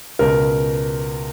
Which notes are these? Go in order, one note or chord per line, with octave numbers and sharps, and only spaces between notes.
C#2 B2 A#4